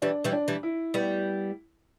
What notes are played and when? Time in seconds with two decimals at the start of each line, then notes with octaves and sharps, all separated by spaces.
0.02 E3 G3 D4
0.24 E3 G3
0.33 D4
0.48 E3 G3
0.63 E4
0.94 G3 B3